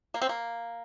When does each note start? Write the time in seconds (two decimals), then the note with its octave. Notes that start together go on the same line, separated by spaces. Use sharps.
0.14 A#3
0.22 C4
0.29 A#3